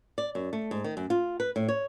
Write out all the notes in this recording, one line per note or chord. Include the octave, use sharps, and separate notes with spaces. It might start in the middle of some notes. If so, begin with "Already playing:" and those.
D5
F#2
A3
G#2
D#3
F#2
F4
B4
A2
C#5